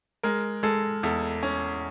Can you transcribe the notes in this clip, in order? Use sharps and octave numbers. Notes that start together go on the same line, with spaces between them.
G#3 A#4
G#3 A4
E2 A4
C#4